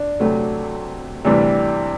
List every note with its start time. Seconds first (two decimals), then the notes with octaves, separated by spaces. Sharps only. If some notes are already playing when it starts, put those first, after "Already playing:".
Already playing: D4
0.20 D2 C3 F#3 A3
1.25 D2 C3 E3 G3 D4